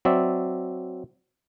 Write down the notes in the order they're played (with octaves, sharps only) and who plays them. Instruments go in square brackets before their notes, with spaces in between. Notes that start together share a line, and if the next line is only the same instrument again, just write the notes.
[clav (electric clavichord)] F#3 C4 D5 E5